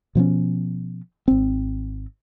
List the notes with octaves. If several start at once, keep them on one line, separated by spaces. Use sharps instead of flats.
B2 F3 B3 C#4
G#1 C4